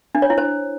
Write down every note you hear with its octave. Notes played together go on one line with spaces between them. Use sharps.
D4
C#5
E4
C5